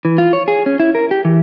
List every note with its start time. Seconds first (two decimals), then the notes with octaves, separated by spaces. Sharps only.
0.05 E3
0.18 F4
0.33 C#5
0.48 G#4
0.66 C#4
0.80 E4
0.95 A#4
1.11 G4
1.25 E3